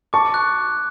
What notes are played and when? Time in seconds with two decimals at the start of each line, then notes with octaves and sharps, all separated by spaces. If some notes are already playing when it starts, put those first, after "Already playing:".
0.13 A5 C#6 D6
0.34 F#6